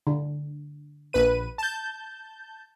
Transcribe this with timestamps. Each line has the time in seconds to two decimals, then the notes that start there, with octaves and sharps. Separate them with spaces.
0.07 D3
1.13 A#1 B4 D#7
1.58 A5 G6